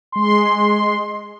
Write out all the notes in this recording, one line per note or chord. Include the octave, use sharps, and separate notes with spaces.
G#3 C6